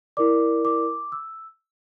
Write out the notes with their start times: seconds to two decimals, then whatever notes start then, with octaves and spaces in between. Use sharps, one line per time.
0.17 E4 A#4 D5 D6
0.65 D6
1.12 E6